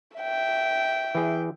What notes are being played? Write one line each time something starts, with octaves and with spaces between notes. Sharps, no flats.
E5 G5
E3 G#4